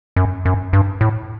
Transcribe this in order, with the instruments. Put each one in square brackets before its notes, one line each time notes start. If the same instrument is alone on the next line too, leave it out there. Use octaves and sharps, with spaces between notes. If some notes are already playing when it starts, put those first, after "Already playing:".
[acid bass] F#2
F#2
G2
A2